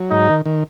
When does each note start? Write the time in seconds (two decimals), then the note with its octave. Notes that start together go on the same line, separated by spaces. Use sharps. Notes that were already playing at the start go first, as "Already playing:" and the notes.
Already playing: F#3
0.11 G#2 D#4
0.29 D#3
0.46 D#3